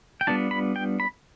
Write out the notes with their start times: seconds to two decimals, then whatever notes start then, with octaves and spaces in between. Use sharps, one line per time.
0.21 G5
0.27 G3 B3 D4 F4 A5
0.51 B5
0.76 G5
1.00 B5